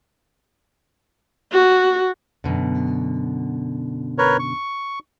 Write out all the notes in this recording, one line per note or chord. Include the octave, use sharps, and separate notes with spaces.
F#4
F#2 B2 D3
A#4 B4 C#5
C#6